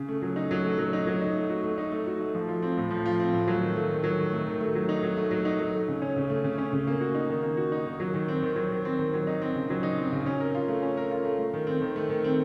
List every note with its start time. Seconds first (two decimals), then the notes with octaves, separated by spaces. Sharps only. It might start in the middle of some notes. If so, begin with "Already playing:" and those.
Already playing: C#3
0.08 A3
0.22 F#3
0.36 D#4
0.51 F#3
0.64 A3
0.78 F#3
0.93 D#4
1.07 F#3
1.21 D#4
1.36 A3
1.50 F#4
1.63 A3
1.78 D#4
1.92 A3
2.06 F#4
2.20 A3
2.35 F3
2.49 F4
2.62 C4
2.77 A2
2.90 F3
3.06 F4
3.20 C4
3.33 A2
3.48 F#3
3.61 D#3
3.76 A3
3.89 D#3
4.04 F#3
4.18 D#3
4.33 A3
4.47 D#3
4.61 A3
4.75 F#3
4.89 D#4
5.03 F#3
5.17 A3
5.31 F#3
5.45 D#4
5.59 F#3
5.74 A3
5.88 C#3
6.02 C#4
6.16 C#3
6.30 A3
6.44 C#3
6.58 C#4
6.73 C#3
6.87 A#3
7.01 F#4
7.15 D#4
7.30 D#3
7.43 A#3
7.57 F#4
7.72 D#4
7.86 D#3
8.00 F#3
8.14 D#3
8.28 C4
8.43 D#3
8.56 F#3
8.70 D#3
8.85 C4
8.99 D#3
9.13 F#3
9.27 D#4
9.42 C4
9.55 C#3
9.70 F#3
9.83 D#4
9.98 C4
10.12 C#3
10.26 C#4
10.40 A#4
10.55 F4
10.68 A3
10.82 C#4
10.97 A#4
11.11 F4
11.25 A3
11.39 A3
11.54 D#3
11.67 C4
11.82 D#3
11.96 A3
12.09 D#3
12.24 C4